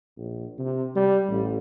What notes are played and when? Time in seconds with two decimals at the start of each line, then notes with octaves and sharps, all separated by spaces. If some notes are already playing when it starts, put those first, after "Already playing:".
0.17 A#1
0.58 C3
0.96 G3
1.29 A1